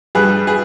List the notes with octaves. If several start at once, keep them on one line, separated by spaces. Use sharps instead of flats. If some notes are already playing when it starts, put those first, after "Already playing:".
G2 G3 G#4 B4
G#4 B4